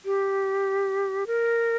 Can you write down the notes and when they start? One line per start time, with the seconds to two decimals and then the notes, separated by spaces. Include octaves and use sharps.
0.05 G4
1.27 A#4